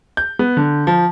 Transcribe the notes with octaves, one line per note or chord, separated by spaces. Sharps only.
G6
B3
D3
F3